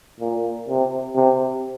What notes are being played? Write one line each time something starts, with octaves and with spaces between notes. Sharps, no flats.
A#2
C3
C3